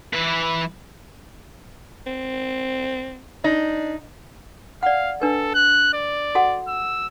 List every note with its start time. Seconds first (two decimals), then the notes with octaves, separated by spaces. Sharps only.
0.13 E3 B4
2.07 C4
3.44 D4 D#4
4.83 D5 F5 F#5
5.22 D4 A4 B4
5.55 F#6
5.94 D5
6.35 F#4 A4 F#5
6.68 E6